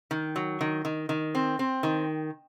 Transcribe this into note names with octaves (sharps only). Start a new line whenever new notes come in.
D#3
F#3
D#3
D#3
D#3
C4
C4
D#3